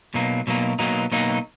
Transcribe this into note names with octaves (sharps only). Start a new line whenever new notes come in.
B2 F#3 A#3 D#4
B2 F#3 A#3 D#4
B2 F#3 A#3 D#4
B2 F#3 A#3 D#4